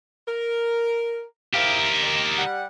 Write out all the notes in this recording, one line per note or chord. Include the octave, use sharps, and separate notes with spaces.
A#4
E4 G4 A#4 C5 F5
D#3
G3 F#5